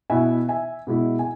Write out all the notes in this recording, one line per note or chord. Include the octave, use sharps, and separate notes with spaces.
B2 B3 E4 E5 G#5
E5 G#5
B2 G#3 E4
G#5